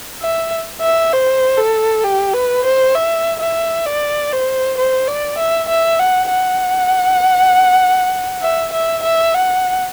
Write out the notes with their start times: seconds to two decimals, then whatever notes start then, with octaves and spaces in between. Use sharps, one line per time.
0.22 E5
0.81 E5
1.13 C5
1.58 A4
2.04 G4
2.34 B4
2.65 C5
2.95 E5
3.41 E5
3.86 D5
4.32 C5
4.78 C5
5.07 D5
5.38 E5
5.69 E5
5.99 F#5
6.30 F#5
8.42 E5
8.73 E5
9.03 E5
9.34 F#5